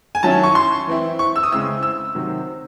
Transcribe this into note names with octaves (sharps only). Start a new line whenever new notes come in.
G#5
D#3 F#3 C#4 E4 A5
C#6
C6
E3 C4 E4
C#6
E6
D#6
C#3 G#3 C4 E4 E6
E6
C3 D#3 F#3 C4